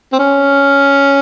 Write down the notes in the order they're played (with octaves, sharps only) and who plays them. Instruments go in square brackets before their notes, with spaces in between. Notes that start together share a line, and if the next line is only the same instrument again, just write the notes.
[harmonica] C4
C#4